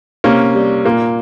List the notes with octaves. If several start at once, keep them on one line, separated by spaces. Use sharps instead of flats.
C3 A#3 C#4
G3
A#2 A#3